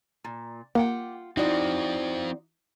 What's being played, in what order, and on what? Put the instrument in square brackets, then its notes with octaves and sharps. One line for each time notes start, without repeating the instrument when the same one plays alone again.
[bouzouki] A#2
[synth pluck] A#3 [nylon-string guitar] F4 F#5 G5 [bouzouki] G4
[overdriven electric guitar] F3 C4 [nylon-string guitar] D#4 E4 F#4 [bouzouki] C5 D5